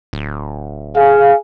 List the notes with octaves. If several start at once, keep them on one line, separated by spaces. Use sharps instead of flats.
D1
G#4 F5